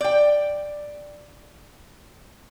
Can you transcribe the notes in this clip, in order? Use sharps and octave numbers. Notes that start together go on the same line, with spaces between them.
D5 G5